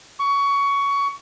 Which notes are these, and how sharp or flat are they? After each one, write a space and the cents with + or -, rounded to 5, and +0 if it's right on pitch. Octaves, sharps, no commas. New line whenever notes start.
C#6 +20